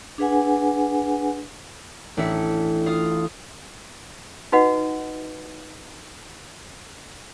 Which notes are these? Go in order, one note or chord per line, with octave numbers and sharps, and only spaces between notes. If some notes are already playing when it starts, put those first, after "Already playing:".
D4 G#4 B4 F#5 G#5
A1 D4 E5 C#7
F4 F5 D#6
D#4 F#4 B4 D#5 F#5